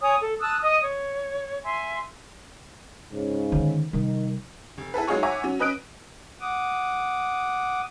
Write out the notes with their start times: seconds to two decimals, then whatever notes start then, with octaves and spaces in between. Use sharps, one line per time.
0.01 C#5 G#5 A#5 D#6
0.21 A4
0.40 A5 D#6 E6 F#6
0.63 D#5 D#6
0.82 C#5
1.63 E5 G#5 C6
3.12 G#2 C#3
3.52 D3 D#3
3.93 C3 D#3 G3
4.78 F1
4.94 E4 G#4 A4 B4
5.08 F#3 G#3 D#4 F4 G#4 C#5
5.23 C#5 E5 F#5 G#5 A#5 D6
5.44 F#3 C#4
5.59 C#4 B4 D#5 D#6 F#6 D7
6.41 F#5 D6 D#6